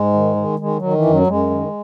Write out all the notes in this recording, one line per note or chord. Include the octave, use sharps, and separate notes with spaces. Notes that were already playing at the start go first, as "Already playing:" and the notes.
Already playing: G#2 G#3
D#3
D#3
D#3 G#3
F#3
D#3
E3
F#2
F#3
F#2 G#3
D#3